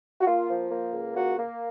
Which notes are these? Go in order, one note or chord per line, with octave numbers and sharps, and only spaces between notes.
F#4
A#3 F4
F3
A#3
C#2
A#3 F#4
A#3